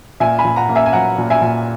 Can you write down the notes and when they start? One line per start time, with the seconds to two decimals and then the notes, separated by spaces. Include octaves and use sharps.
0.20 A#2 E5 G#5
0.39 G#5 B5
0.45 A#2
0.56 F#5 A#5
0.69 A#3
0.75 E5 G#5
0.86 G#5
0.93 F#3 F#5 A#5
1.18 A#2
1.30 E5 G#5
1.41 A#2